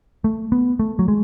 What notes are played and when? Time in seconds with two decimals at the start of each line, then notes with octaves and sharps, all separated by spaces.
0.24 A3
0.52 B3
0.79 A3
0.99 F#3
1.08 G#3